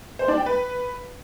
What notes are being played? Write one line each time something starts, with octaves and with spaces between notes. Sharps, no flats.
C5
D4
G5
B4